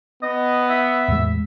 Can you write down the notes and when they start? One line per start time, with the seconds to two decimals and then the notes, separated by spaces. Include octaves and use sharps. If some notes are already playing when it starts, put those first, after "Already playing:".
0.23 B3 D#5
0.70 E5
1.08 E2 A2 G#3